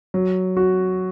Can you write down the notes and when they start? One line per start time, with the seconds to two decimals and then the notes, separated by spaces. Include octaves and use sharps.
0.14 F#3
0.57 F#4